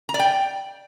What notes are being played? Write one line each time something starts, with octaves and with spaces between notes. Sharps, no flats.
A#5
D5
G5